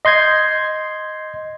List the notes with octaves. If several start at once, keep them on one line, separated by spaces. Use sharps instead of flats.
D#5 C6 G6 G#6 C7